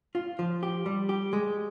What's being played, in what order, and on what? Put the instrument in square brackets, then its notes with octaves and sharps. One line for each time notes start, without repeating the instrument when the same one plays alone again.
[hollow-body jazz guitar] F4
F3
G4
G3
G4
G#3